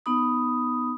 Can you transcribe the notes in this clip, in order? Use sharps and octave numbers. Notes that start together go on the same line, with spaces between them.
B3 D#4 B5 D#6